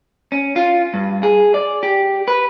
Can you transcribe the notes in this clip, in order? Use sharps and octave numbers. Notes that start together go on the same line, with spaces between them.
C#4
F4
G2
G#4
D5
G4
B4